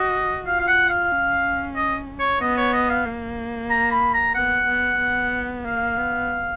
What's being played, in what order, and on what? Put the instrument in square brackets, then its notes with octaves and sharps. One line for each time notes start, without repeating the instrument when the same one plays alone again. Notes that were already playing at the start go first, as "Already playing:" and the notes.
Already playing: [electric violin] F#4 [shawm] D#5
[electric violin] F4 [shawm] F5
[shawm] F5
F#5
F5
[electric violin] C#4
[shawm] D#5
C#5
[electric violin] B3 [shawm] D#5
[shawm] C#5
D#5
F5
[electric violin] A#3
[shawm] A#5
B5
A#5
[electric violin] B3 [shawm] F#5
[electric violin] B3
B3
[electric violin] A#3 [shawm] F5
[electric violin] B3